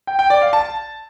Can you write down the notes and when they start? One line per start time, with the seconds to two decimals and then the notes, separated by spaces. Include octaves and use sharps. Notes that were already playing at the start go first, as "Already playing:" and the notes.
0.07 G5
0.19 G5
0.30 D5
0.42 F5
0.53 A5